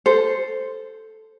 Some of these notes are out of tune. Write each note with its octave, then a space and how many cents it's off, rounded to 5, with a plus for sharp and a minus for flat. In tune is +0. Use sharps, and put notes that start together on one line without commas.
A4 +0 C5 +0